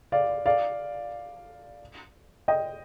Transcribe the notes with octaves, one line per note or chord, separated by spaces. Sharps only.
D5 F5
D5 F5
D#5 G5